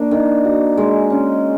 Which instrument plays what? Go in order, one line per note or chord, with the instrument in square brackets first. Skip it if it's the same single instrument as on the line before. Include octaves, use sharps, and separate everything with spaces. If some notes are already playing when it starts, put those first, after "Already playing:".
Already playing: [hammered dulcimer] A#3 D4
D#3
F#4
G#3
C#4